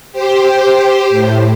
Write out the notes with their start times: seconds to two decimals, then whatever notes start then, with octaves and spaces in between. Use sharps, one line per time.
0.12 G4 C5
1.10 A2